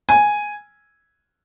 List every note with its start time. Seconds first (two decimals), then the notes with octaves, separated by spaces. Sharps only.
0.09 G#5